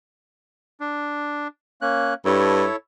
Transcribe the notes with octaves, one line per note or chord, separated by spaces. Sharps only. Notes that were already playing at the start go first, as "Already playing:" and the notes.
D4
A#3 C#4 F#6
G2 E4 A4 C#5